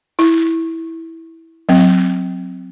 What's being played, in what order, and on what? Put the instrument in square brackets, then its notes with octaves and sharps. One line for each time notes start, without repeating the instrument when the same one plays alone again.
[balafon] E4
F#3 C4